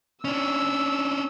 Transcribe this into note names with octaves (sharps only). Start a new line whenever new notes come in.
C#4 D4 E6